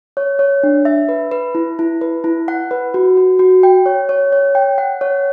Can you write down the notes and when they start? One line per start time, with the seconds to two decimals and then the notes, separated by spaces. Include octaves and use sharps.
0.17 C#5
0.39 C#5
0.63 D4
0.85 E5
1.09 B4
1.32 B4
1.55 E4
1.79 E4
2.01 B4
2.24 E4
2.48 F#5
2.71 B4
2.94 F#4
3.17 F#4
3.39 F#4
3.63 G5
3.86 C#5
4.09 C#5
4.32 C#5
4.55 G5
4.78 F#5
5.01 C#5